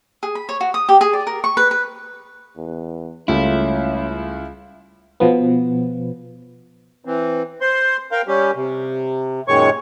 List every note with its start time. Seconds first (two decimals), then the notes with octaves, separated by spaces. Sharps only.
0.23 G#4
0.35 B5
0.49 C#5
0.61 F#4
0.74 D#6
0.89 G4
1.01 G#4
1.13 D5
1.27 A#4
1.44 C#6
1.57 B4
1.71 B4
2.57 E2
3.28 C#2 G3 A3 C#4 E4 F4
5.20 B2 F3 B3
7.05 E3 C4
7.61 C5 C6
8.12 A#4 F5 G5
8.28 G3 C#4 G4
8.56 C3
9.48 F#2 A#2 D#3 G#3 C#5 C#6